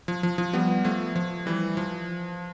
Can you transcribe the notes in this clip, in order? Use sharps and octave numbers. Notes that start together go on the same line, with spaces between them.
F3
F3
F3
G3 B3
F3 A3
F3
E3 G3
F3